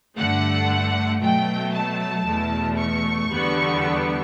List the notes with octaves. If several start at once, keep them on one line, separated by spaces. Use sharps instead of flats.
G2 D3 A3 F#5
B2 F#3 A3 G5
A5
E2 B2 A3
C#6
E2 D3 G3 B3